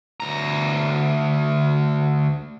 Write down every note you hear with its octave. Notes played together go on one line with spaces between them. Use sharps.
D2 A#5